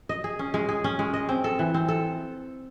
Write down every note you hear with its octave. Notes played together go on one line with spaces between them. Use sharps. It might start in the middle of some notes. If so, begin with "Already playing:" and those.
D#5
G#4
C#4
G#3
G#4
C#4
G#3
D#5
C4
A4
E3
C4
A4